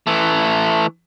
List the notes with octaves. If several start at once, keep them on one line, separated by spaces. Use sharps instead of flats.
E3 A3